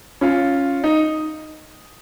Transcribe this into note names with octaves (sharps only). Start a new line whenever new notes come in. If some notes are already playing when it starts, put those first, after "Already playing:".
C#4 F4
D#4